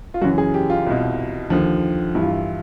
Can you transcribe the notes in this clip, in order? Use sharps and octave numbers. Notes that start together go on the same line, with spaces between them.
F4
F#2 C#3 E3 F#4
G#4
G4
F4
C2 B2
D#2 D3 F3
G2 E3 E4
F4
E4